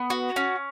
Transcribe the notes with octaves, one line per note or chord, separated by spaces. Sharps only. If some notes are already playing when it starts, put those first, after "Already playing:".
Already playing: B3
F#4
C#4